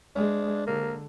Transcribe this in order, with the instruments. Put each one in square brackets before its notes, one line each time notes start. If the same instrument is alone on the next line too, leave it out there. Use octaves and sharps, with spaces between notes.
[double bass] G#3 [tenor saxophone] D4
[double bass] D3 [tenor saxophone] A#3